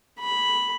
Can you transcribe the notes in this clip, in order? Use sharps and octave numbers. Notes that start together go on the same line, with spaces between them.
B5